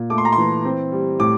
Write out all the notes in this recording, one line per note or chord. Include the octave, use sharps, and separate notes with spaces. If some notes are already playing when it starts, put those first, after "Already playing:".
Already playing: A#2
A3 D6
C6
A#5
C6
E3
C4
G3
A2 D6